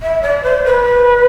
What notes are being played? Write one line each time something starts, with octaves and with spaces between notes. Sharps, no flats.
E5
D5
C5
B4